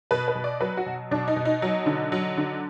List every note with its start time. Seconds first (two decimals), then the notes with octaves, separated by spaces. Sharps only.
0.11 B2 B4
0.28 B4
0.35 B2
0.44 D5
0.60 F#3 B4
0.77 F#4
0.86 B2
1.11 B2 D4
1.28 D#4
1.36 B2
1.45 D#4
1.62 F#3
1.86 D3
2.12 F#3
2.37 D3